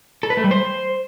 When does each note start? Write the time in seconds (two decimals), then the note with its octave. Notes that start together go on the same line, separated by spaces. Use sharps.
0.23 A4
0.30 B4
0.37 A3
0.44 G3
0.51 C5